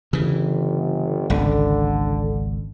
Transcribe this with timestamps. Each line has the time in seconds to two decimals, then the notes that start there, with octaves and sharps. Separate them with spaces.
0.13 G1 C#3 E3
1.30 G#1 C#2 D3